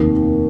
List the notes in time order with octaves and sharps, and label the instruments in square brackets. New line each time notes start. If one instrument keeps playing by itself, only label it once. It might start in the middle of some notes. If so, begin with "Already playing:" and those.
Already playing: [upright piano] F1 D#2 D#3